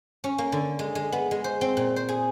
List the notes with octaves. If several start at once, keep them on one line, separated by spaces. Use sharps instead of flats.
C#4
A#3
D3
G#3
G#3
B3
G#3
C5
C4
A#2
C5
G#4